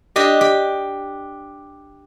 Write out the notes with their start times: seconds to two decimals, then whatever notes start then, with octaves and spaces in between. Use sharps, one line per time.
0.16 D4 G4 D#5
0.41 G4